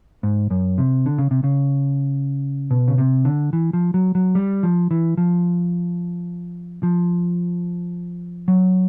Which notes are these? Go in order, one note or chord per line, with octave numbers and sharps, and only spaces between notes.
G#2
F#2
C3
D3
C#3
C3
C#3
B2
C#3
C3
D3
E3
F3
F#3
F#3
G3
F3
E3
F3
F3
F#3